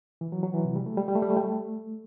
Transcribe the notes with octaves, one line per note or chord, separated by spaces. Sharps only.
E3
F#3
F#3
E3
C3
G3
A3
G3
G3
A3
G3
A3
G3
A3